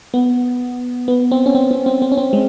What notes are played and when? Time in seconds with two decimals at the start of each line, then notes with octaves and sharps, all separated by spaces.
0.14 B3
1.08 B3
1.31 C4
1.46 C#4
1.55 C4
1.71 C4
1.86 C4
2.02 C4
2.12 C#4
2.18 C4
2.33 G#3